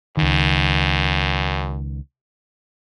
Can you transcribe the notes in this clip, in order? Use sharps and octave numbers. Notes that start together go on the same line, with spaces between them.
C#2 F#2 D#3